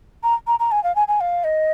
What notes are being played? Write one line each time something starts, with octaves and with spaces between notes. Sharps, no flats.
A#5
A#5
A#5
G#5
F5
G#5
G#5
F5
D#5